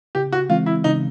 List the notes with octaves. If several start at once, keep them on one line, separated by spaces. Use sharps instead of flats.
C#3 G4
F#4
E3 G#3 C4 F4
E4
C#3 D#4